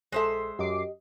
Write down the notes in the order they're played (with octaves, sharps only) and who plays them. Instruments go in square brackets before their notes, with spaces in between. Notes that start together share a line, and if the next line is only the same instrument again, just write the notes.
[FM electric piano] A#1 A4 [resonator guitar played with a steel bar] G#3 C5 E5
[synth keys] F#2 D6 C7 [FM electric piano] G4 D#5